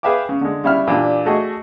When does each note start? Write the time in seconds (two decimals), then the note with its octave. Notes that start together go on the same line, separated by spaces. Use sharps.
0.03 G#4 B4 E5 F5 G5 D6
0.29 C#3
0.41 D3 G#3
0.64 C#3 G3 E4 E5 F6
0.87 A#2 E3 D4 G4
1.26 A3 F#4 G#4 D#5